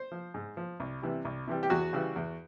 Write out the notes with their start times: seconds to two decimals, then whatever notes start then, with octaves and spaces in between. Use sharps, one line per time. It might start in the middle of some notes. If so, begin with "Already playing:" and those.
Already playing: C5
0.12 F3
0.34 G#2
0.57 F3
0.80 C2
1.02 C3 E3 G3
1.25 C2
1.48 C3 E3 G3
1.63 G4
1.70 E2 F#4
1.93 C#3 E3 G3
2.16 E2